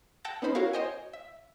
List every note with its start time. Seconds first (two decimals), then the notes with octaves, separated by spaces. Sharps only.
0.24 F#5 G5 A5 E6 G6 A#6
0.42 B3 C#4 D#4 C5 B5
0.55 E4 F#4 A#4 C#5 F5
0.73 C5 C#5 D#5 G5 G#5
1.13 E5